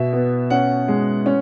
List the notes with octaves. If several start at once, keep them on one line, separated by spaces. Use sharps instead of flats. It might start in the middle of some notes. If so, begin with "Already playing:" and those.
Already playing: B2 E5
B3
C#4 F#5
G#3
C#4